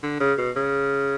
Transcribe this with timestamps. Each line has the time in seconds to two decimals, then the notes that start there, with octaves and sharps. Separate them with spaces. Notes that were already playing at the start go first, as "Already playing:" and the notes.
0.03 D3
0.20 C#3
0.38 B2
0.56 C#3